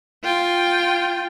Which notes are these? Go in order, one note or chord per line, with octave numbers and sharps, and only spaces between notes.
F4 G5